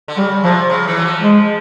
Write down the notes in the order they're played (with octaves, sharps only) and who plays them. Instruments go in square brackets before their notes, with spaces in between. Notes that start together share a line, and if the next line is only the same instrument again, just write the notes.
[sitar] D3
[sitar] C#3 [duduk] G3
[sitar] C3 [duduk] F3
[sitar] C#3
E3
F#3
F3
[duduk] G#3